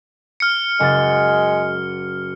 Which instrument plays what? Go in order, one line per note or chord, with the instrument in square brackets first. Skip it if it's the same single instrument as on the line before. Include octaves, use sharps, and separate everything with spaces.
[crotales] F6 C#7
[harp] F#1 F#5 A6 [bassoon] G#3